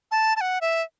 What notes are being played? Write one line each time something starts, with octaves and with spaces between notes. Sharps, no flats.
A5
A5
F#5
E5